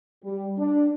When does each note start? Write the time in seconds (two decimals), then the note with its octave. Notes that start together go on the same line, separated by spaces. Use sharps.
0.23 G3
0.58 D4